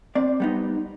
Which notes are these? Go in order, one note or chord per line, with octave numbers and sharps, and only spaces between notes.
C4 D5
G3 B3 D#4